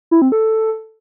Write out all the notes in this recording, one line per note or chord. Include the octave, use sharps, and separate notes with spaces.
E4
C4
A4